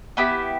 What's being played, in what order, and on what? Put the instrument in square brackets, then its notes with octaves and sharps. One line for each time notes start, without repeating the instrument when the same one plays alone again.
[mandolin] B3 E4 G4 B5